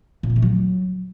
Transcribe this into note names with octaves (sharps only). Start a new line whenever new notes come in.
A#2
B3
A3
F#3